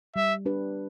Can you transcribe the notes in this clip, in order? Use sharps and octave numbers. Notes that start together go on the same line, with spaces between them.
G3 E5
D4 G4 B4